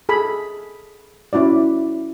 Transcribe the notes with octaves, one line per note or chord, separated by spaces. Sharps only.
G#4 A4 B5
C#4 E4 F#4 D5